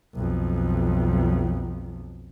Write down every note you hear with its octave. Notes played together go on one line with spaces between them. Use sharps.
B1 F2